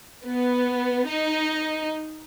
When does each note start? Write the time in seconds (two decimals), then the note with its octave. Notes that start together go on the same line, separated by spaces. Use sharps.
0.25 B3
1.08 D#4